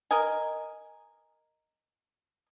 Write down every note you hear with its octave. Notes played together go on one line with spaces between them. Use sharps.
A#4 D#5 G#5